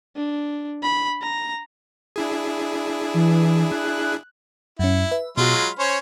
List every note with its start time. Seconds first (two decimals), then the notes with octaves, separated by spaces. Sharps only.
0.17 D4
0.83 B5
1.22 A#5
2.16 D4 E4 G#4
3.14 E3
3.72 F#6
4.79 F#2 C#4 E4
5.12 B4 E5
5.37 B2 F#3 G#3 F4 F#4
5.62 B5 F6
5.79 C#4 C5 C#5